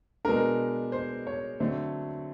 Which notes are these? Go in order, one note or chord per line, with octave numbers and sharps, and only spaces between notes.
B2 G#3 B3 D4 A#4
C5
C#5
D3 F#3 A3 C4